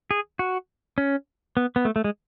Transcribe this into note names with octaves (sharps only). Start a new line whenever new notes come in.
G#4
F#4
C#4
B3
B3
A3
A3
G#3